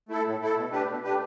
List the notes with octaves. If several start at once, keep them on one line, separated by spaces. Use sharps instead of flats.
A3 E4 A4
A2
A3 E4 A4
B2
A3 D4 G4 B4
B2
A3 D4 G4 B4